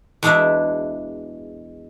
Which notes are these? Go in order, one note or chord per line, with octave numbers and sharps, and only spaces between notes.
E2 G#3 D4 E4 F#4 E5